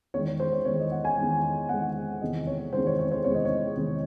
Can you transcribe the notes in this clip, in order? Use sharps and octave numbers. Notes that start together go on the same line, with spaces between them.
E2 D#3 G#3 C#5
C#5
C5
C#5
E2 D#3 G#3 C#5
D#5
F#5
G#5
E2 D#3 G#3
E2 D#3 G#3 F#5
E2 C3 D#3 G#3 D#5
C#5
E2 C3 D#3 G#3 C5
C#5
C#5
C5
E2 C3 D#3 G#3 C#5
D#5
C#5
E2 C3 D#3 G#3